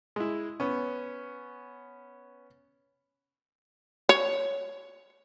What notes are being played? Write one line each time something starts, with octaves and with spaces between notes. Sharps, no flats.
G#3 E4
B3 C#4
C#5